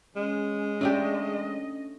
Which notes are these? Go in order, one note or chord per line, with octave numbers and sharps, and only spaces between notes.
G#3 C#4
A3 C#4 D4 G4 D#5